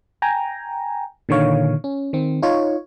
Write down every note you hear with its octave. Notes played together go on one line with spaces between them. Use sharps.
G5 G#5 A#5
A#2 D3 D#3 C#5 F5
C#4
D#3 C4
D#4 F4 C#5